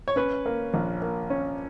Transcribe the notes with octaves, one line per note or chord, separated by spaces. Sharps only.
C#5
C#4 B4
A#3
A#1
A#3
C#4